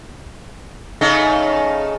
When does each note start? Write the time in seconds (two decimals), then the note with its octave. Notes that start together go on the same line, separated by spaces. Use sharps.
1.01 C#3 A3 D#4